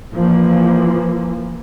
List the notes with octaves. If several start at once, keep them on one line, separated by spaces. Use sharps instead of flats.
E3 F3 A#3